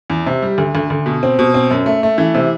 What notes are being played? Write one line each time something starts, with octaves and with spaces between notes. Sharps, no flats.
E2
C3
G3
D2
D2
D2
B2
C4
B2
C4
F#2
A3
A3
E3
C3